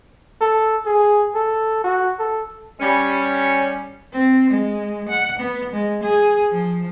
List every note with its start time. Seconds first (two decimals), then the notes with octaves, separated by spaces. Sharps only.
0.41 A4
0.86 G#4
1.35 A4
1.84 F#4
2.19 A4
2.80 G3 C#4
4.13 C4
4.51 G#3
5.09 F#5
5.40 B3
5.74 G#3
6.04 G#4
6.51 F3